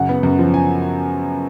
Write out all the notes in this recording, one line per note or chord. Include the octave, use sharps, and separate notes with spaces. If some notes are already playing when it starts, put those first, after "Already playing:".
Already playing: F#2 C#3 F#5
B3
F#2
F3
G#5